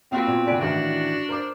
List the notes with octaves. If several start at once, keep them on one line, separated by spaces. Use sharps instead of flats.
A#3 C4 F4 F#4 B4
A#2 B3
D3 B4 D5 G5 G#5
A1 D#3 E3 D4 F#4
A#4 C5 D6